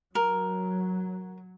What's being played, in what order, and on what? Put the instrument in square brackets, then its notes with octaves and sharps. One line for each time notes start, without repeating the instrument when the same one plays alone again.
[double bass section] F#3 [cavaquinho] A#4